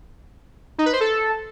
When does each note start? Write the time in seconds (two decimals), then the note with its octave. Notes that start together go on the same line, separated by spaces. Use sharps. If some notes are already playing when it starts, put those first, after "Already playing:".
0.78 D#4
0.86 B4
0.93 C5
1.00 A4